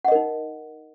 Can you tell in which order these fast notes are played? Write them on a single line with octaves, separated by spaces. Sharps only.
F#5 D#5 A#4 D#4